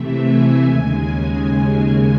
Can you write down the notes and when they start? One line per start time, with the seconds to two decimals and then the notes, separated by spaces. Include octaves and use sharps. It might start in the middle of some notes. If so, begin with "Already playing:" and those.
Already playing: C3 E3 A3 E5
0.16 G#5
0.62 D#2 C#3 G#3